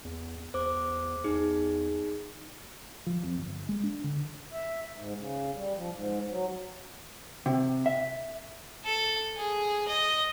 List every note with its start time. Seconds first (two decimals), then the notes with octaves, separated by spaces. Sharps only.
0.05 E2
0.54 E2 C5 D6
1.24 E2 D#4 G#4
3.06 F3
3.23 F2
3.38 G1
3.69 G#3
3.83 D4
4.04 D3
4.52 E5
4.95 G#2
5.17 C#3
5.55 G3
5.75 F3
5.92 G#2
6.29 F#3
7.46 C3
7.86 E5
8.85 A4
9.37 G#4
9.88 D#5